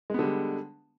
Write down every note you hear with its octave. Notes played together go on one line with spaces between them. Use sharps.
D3 G3 G#3 B3